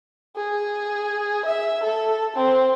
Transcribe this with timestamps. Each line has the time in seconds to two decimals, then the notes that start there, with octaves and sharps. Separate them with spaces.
0.36 G#4
1.45 E5
1.84 A4
2.36 C4